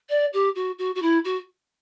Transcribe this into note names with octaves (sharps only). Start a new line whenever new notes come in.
D5
G4
F#4
F#4
F#4
E4
F#4